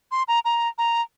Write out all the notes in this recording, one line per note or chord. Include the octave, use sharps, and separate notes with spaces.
C6
A#5
A#5
A#5